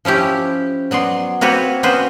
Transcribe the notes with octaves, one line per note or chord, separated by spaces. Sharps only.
F3 C#4 E4 G4
F#3 B3 D5 C6
A#3 C4 F#4 B4 C#5
A#3 B3 C#4 F#4 B4 C5